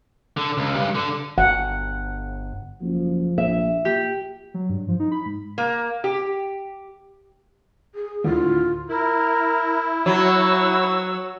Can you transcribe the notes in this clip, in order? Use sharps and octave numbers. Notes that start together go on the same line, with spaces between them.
D3
C#2
G2
D3
G1 F#5
F#1 F3
A#1 E5
A#2 G4
F#3
G2
F3
D#4
B5
G#2
A#3
G4
G#4
D2 A2 F4
E4 A#4
F#3 F#4 C#5 E6